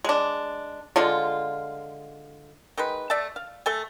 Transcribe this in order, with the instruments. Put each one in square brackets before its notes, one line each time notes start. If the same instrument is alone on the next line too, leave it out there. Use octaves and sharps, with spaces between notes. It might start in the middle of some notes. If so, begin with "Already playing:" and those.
[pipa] G#3 D4
D3 G#3 F4
D#3 G#3 B4
A3 D5 E5 A5
F5
A3 A4 G#5